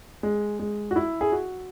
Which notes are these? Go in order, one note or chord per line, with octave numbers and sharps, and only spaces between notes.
G#3
G#3
F#4
E4
G#4
F#4